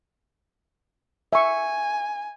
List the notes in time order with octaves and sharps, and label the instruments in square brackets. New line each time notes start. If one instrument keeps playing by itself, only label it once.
[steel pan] E5 C#6 [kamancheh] G#5